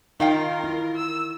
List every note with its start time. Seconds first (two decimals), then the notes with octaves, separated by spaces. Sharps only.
0.20 D#3 D#4 F4 A#4 F5 G5
0.64 E4
0.96 E6